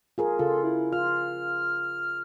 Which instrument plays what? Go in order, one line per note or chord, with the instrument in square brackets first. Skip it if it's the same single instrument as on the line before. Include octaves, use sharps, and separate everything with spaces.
[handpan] F4 G#4 A#4
[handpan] C#3 F4 [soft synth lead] A4
[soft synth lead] E4
[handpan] F4 [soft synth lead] F6